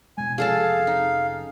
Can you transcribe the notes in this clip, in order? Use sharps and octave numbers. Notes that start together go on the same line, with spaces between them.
B2 G#3 G#5
F1 F3 C#4 G#4 A4 F5 A5
D#4